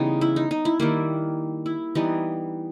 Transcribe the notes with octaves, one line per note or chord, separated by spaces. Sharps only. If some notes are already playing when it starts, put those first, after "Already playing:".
Already playing: C#3 E3 G3 B3 D#4
E4
D#4
D#4
E4
D#3 G3 A#3 E4
E4
E3 G3 B3 D#4